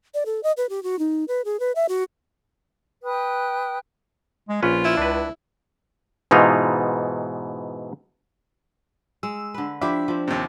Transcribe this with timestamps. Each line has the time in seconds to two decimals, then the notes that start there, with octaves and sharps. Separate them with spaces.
0.14 D5
0.26 A4
0.43 D#5
0.57 B4
0.70 G4
0.83 F#4
0.99 D#4
1.28 B4
1.45 G#4
1.60 B4
1.76 E5
1.89 F#4
3.03 B4 G5 D#6 F#6
4.49 G#3
4.63 A#1 C#4 F4 B4
4.85 E4
4.97 C#2 D4 B4
6.31 G#2 B2 E3 D#4 F4
9.23 G#3 E6
9.54 D3 B4
9.81 F3 D4 E4 G4 E5
10.08 F3 C4
10.28 D#2 C3